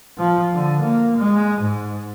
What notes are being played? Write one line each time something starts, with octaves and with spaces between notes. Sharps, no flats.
F3
D3
A#3
G#3
G#2